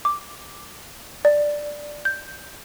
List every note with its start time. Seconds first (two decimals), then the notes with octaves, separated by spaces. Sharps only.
0.05 D6
1.25 D5
2.05 G6